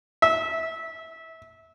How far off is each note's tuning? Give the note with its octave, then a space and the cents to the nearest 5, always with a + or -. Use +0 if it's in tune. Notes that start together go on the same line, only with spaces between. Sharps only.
E5 -20